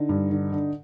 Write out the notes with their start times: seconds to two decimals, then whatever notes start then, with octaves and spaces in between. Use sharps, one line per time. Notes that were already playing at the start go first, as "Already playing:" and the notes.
Already playing: D3 D#4
0.09 G2
0.31 D3
0.52 D3